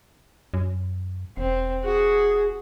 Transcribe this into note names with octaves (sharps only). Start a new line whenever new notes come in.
F#2
E1 C4
F#4 G#4